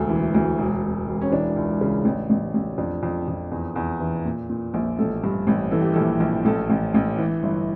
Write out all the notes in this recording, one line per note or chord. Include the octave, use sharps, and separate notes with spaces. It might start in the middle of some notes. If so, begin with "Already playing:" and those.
Already playing: E1 D2 A4
E3
D2
E1
E1
E1
C#4
E3 D4
C#2
C#3
A1
A1
A1
F2 D4
F2
F2
E2
E2
E3
A#2
A#2
A#1
A1 A4
G2
A1
E3 A4
G4
A#1 A4
A#1
A1 A4
A1
A1
E3
G1